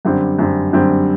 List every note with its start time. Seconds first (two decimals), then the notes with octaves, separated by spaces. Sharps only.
0.05 F#2 D3 G3 C4
0.39 F#2 D3 G3 C4
0.73 F#2 D3 G3 C4